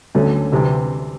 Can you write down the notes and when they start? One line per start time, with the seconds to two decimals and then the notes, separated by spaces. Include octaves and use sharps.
0.15 D2 D3 F#3 A3 C#4
0.52 D2 C3 E3